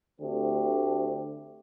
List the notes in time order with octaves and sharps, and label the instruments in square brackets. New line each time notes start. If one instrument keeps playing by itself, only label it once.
[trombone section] D2 D3 A3 C4 G4